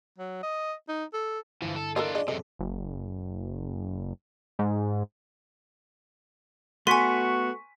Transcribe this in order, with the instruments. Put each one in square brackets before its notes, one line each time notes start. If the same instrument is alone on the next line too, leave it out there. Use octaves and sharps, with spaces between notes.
[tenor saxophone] F#3
D#5
D#4
A4
[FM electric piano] G2 D3 E4 [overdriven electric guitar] E3 F3
[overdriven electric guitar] A4
[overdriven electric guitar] D4 F4 [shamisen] A4 A#4 D#5
[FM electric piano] G#4 D5 [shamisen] D#5
[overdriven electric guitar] F#2 C3 [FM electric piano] G#4 A4 [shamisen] D#5
[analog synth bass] F#1
G#2
[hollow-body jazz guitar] A3 B3 [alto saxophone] F#4 [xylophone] G#5 C6 [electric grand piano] C#6 B6 D#7